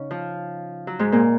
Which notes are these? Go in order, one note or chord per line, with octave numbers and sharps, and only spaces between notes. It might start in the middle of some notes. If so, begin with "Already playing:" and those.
Already playing: C#3 C#4 D#4
F3
F#3
G#2 G#3
A#2 A#3